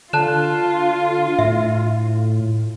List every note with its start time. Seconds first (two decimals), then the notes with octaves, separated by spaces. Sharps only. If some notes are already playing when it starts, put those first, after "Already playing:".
0.13 D3 F4 A5 F#6 E7
1.39 A2 E5